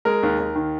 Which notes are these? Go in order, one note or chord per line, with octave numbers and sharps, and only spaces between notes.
G#3 A#4
D#2
D#2
D#3